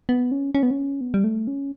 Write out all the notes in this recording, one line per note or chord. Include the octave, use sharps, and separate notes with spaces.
B3
C#4
C#4
B3
C#4
B3
G3
A3
C#4